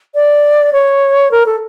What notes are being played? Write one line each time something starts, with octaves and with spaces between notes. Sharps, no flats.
D5
C#5
A#4
A4